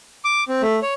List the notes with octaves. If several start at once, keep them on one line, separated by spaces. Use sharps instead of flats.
D6
C4
A3
C#5